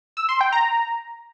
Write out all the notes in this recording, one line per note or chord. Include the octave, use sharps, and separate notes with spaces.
E6
C6
G5
A#5